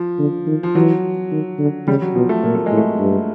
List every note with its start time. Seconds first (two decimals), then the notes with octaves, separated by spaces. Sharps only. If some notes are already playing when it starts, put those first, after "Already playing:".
Already playing: F3
0.19 D3
0.47 D#3
0.63 F3
0.75 E3 F#3
1.31 D#3
1.59 D3
1.87 C#3 G3
2.02 F#3
2.15 B2 F3
2.29 A3
2.43 A#2 A#3
2.55 A3
2.66 G#3
2.72 A2
2.77 A3
2.99 G2